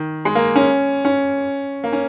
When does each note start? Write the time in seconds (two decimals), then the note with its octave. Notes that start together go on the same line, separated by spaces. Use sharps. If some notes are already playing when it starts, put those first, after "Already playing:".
Already playing: D#3
0.25 G#3
0.35 A#3
0.56 C#4
1.05 C#4
1.84 A#3
1.93 C#4